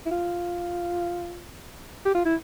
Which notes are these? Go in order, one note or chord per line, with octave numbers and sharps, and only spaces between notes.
E4
F4
G4
F4
E4